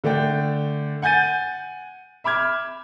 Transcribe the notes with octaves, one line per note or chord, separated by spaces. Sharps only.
D3 A3 D5 G5
F#5 G#5 G6 A6 D#7
E5 B5 D6 F6 G#6